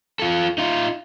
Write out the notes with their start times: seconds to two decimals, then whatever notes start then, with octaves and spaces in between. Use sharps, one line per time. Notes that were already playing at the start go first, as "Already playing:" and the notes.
0.19 F4 A4
0.58 D#4 F4